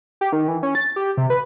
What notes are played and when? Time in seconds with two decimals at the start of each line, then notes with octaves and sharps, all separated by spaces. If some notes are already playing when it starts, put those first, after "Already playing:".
0.21 G4
0.32 D#3
0.48 E3
0.63 C#4
0.75 A6
0.96 G4
1.17 C3
1.30 B4